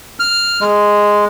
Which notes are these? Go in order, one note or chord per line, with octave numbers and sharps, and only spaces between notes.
F6
G#3